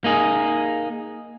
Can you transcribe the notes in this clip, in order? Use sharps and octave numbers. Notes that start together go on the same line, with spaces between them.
A#3 D#4 G#4